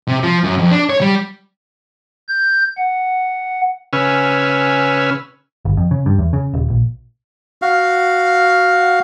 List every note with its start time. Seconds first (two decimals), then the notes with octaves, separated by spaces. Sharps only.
0.08 C3
0.23 F3
0.44 F#2
0.58 F2
0.71 D4
0.90 C#5
1.01 G3
2.29 G6
2.78 F#5
3.93 C#3 C#4 B4 G#5 E6 F6
5.65 G1
5.77 F2
5.91 C#3
6.06 G2
6.19 E2
6.33 C#3
6.54 D#1
6.70 A#1
7.62 F#4 F5